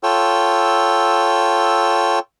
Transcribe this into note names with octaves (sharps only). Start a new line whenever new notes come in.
F4 A4 C#5 G5 E6